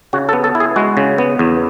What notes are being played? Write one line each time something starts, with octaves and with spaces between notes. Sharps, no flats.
C#3 F#4
A4
B3
A4
E4
G#4
G#3 F#4
C#3
B3
E2